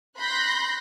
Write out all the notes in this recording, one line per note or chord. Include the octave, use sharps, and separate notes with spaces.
B5 C6 F#6 G6 A#6